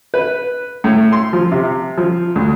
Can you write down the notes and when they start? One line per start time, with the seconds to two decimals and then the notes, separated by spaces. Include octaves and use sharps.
0.14 B4
0.84 A2
1.12 C6
1.33 F3
1.52 C3
1.98 F3
2.35 D2